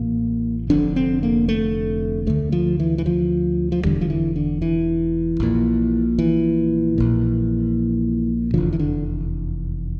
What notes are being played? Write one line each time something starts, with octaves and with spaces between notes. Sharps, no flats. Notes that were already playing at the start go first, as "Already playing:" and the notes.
Already playing: A1 A2 A#3
F1 F2 D3 D4
C4
A#3
A3
D2 D3 A3
F3
E3
E3
F3
F3
E1 E2 D3 G3
F3
E3
D3
E3
A#1 A#2
E3
A#1 A#2
F1 E2 D3 F3
E3
D3